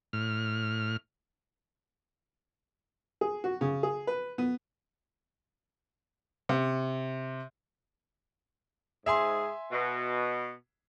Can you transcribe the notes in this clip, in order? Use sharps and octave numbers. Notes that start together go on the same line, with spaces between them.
A2 F6
G#4
F#4
C#3
G#4
B4
B3
C3
G#2 G#4 E5 G#5 C6
B2